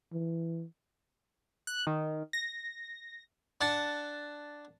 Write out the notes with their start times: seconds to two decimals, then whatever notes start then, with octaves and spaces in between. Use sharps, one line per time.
0.12 E3
1.67 F#6
1.87 D#3
2.33 A#6
3.61 D4 F#5 A5